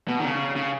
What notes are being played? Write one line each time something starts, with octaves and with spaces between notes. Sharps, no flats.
B2
D#3
C#3
C#3